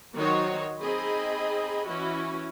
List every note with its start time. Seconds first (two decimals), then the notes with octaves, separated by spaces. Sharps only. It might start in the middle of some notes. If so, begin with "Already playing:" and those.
0.15 D#3 F#3 D#4 F#4 C5 C#5
0.82 C4 D#4 G#4 D#5 B5
1.86 E3 C#4 E4 F#4